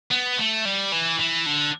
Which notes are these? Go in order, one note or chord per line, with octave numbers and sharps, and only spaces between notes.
B3
A3
G3
E3
E3
D3